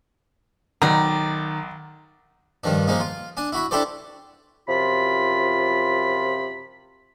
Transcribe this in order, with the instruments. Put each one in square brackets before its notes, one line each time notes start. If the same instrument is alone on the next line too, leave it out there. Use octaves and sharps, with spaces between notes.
[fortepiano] B1 [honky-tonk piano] D#3 [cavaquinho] D5 A#5
[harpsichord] G2 D#3 F3 D4
F3 G#3 A#3 D#4
F4
D4 G#5
E4 F#4 B5
D4 E4 G4 A4 C5 D5
[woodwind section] F#2 C3 F3 F4 B5